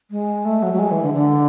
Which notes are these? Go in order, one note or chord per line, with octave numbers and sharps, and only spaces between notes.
G#3
A3
F#3
F#3
G#3
E3
D3
D3